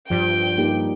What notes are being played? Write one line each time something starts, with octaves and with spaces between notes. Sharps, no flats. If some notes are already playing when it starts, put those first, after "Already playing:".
G2 F3 G5
A#3 D#4 G4